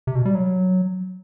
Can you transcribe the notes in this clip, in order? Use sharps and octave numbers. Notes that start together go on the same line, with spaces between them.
C3
B2
G3
F#3